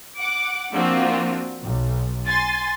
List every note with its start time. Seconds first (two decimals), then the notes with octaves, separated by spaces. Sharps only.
0.19 F#5 D6
0.74 F3 A#3 C4 D4 F4 F#4
1.63 B1
2.26 G#5 C6 A6